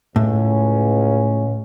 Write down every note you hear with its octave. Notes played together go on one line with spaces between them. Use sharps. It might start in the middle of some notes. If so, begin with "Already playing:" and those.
C#2 A2 C#4